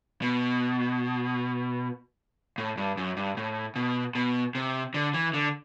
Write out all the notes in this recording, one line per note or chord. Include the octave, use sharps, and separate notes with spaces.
B2
A2
G2
F#2
G2
A2
B2
B2
C3
D3
E3
D3